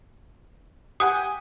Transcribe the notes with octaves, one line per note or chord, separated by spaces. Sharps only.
G4 F#5 G#5 D#6